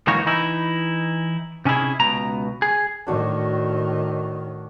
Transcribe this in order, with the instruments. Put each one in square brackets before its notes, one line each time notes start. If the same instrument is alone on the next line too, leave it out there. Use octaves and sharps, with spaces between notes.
[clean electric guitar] C#2 E3 A#3 D#4 F#4 C#5
E3 D#4 E4
C3 C#4 D#4 E4 G#4
C#2 B2 A#5
G#4
[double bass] A2 D#3 [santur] D4 F#4 C#5